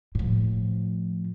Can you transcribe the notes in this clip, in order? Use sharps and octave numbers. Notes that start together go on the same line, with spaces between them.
A2 F3